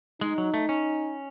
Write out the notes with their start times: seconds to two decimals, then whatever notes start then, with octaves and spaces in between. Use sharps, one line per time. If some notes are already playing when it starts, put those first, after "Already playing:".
0.21 G#3 D#4
0.38 F#3
0.54 A3
0.69 C#4